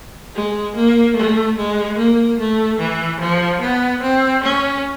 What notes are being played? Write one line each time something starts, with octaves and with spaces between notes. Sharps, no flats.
G#3
A#3
A3
G#3
A#3
A3
E3
F3
B3
C4
C#4